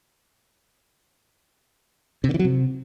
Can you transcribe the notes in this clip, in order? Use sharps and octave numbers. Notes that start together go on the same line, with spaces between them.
C3
D3
E3
F#3
C3